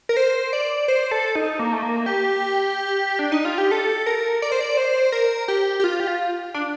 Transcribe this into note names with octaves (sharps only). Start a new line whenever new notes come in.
A#4
C5
D5
C5
A4
D#4
A#3
A3
A#3
G4
D4
D#4
F4
G4
A4
A#4
D5
C5
D5
C5
A#4
G4
G4
F4
G4
F4
D4